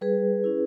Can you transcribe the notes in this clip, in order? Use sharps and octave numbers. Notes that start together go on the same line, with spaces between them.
G3 G#4 B4
C#4 E4